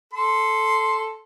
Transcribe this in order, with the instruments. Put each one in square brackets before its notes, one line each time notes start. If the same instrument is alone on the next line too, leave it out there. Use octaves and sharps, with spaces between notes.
[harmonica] A4 C6